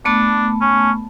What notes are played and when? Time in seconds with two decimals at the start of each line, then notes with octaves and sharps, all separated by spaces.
0.05 A3 B3 D4 A5
0.61 C#4